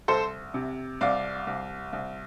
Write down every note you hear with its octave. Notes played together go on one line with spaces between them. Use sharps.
C2 A4 C5
C3
C2 D5 F5
C2
C2